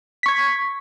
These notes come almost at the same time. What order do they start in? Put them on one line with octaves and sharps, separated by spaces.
B6 C#6 G#6